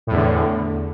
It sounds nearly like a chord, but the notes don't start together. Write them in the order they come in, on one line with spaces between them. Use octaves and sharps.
A2 E2 D3